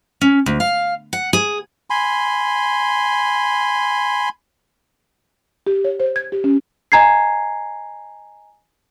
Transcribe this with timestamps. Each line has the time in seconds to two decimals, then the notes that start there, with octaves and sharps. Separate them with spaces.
0.21 C#4
0.46 D2
0.60 F5
1.13 F#5
1.33 G#4
1.90 G#5 B5 C6
5.67 G4
5.84 C#5
6.00 C5
6.16 G#6
6.32 G4
6.44 C#4
6.92 D#5 G#5 A#5 G#6 C7